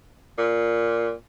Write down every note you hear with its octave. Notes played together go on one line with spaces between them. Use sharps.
A#2